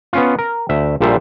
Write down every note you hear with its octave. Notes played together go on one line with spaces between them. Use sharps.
B3 C#4 F4
A#4
D2 E5
A#1 A#2 G3 A4 C5 E5